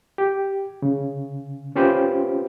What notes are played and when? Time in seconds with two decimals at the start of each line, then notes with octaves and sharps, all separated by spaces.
0.18 G4
0.82 C#3
1.76 C4 C#4 F4 G4 B4 C5